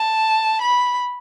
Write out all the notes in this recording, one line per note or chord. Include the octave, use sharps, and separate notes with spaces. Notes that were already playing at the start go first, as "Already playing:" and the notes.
Already playing: A5
B5